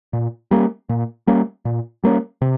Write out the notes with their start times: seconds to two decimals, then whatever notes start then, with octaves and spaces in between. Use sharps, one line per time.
0.13 A#2
0.51 G3 A#3 C#4
0.89 A#2
1.27 G3 A#3 C#4
1.65 A#2
2.04 G3 A#3 C#4
2.42 C3